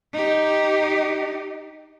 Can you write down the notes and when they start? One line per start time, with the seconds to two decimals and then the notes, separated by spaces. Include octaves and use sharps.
0.13 D#4 G4